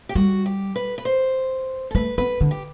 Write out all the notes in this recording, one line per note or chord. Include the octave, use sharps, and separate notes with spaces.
G4
G3 F#4
G4
B4
B4
C5
A4
A3 B4
B3 B4
D3
G4